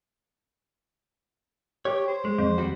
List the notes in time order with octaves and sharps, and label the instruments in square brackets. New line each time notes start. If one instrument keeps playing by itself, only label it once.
[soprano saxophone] G4 [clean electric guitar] C#5
[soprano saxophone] C5
[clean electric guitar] G#3
[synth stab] F2
[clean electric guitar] D#2 G3 F#4